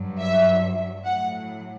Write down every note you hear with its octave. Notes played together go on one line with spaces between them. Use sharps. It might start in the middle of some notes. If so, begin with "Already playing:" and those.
Already playing: G2 F#3
E5
A2 F#3 F#5